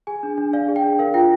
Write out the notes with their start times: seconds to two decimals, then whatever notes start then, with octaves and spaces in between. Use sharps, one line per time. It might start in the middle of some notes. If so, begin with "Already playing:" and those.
0.07 G#4 G#5
0.23 D4
0.38 D4
0.53 D5 F5
0.68 G#4
0.76 G5
0.84 D4
0.99 A#4 F5
1.14 F4 G5